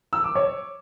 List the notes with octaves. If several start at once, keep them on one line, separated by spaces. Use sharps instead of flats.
E6
D6
C#5